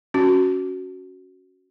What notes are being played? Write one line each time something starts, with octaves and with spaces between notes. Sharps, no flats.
C#4 F#4